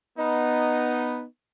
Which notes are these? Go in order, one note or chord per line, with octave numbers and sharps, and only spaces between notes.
B3 D#4